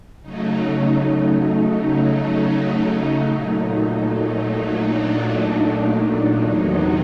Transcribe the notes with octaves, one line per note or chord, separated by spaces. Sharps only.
C#3 F#3 A3 D#4
D#4
A#2 F#3 A3 D#4
D4
E2 C3 D#3 F#3 D#4